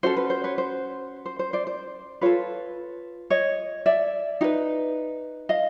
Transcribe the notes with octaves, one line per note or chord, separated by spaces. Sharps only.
C#4 F#4 A4 C5
B4
C5
B4 C#5
C5
C5
C5
C5 D5
C5
F4 A4 B4 C#5
C#5 D#5
D5 E5
D#4 G4 B4
D#5 F5